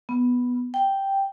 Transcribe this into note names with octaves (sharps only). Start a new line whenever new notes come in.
B3
G5